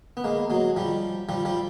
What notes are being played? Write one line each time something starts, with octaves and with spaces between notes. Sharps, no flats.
B3
G#3 A#3
F#3 G#3
F3 G3
F3 G3
F3 G3